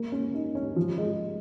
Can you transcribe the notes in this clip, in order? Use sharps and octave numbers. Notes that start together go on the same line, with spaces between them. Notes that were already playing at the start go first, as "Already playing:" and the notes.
Already playing: A#3
C#4
D#4
C#4
F3
G#3